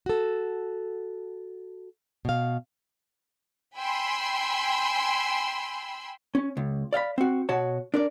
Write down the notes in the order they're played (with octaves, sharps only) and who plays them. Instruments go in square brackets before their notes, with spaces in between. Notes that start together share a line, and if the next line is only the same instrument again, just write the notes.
[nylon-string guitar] F#4 A4
B2 F5
[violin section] G5 G#5 B5 C6 E6
[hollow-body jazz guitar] C#4
C#2
D5 F5 G5 B5
C4 F#4
B2 F#4 C#5 A5
D4 A#4 D5